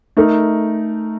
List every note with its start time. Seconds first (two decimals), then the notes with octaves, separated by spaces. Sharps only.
0.17 A3 D#4 A#4